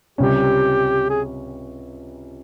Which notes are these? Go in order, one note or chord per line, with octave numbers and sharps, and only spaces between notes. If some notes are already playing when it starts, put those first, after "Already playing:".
C#2 C3 G3 C#4 G4
G#4